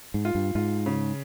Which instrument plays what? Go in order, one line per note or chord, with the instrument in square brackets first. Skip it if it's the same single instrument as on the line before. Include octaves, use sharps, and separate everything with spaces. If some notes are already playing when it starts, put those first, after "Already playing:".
[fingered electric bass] G#2
[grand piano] F4
[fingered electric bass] G2
[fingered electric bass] G#2 [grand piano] F4
[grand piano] C#3